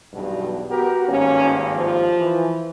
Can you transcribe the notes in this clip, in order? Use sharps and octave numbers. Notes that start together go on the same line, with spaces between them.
B1 E2 G2 B2
B3 F#4 G4 A#4
G#1 G2 A#3 C#4
F3
E3